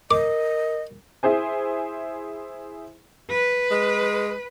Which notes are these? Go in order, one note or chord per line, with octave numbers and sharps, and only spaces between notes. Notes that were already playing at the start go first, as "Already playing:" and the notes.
A#4 D#5 D6
E4 G#4 C5 G#5
B4
G#3